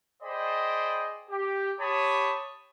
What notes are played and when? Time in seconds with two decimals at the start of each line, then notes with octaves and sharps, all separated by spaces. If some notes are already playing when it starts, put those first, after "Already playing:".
0.22 G#4 C5 D5 D#5 G5 B5
1.30 G4
1.80 G4 C#5 A5 B5 D#6